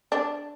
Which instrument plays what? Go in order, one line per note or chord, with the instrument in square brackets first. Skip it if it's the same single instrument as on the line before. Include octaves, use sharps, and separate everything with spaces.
[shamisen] D4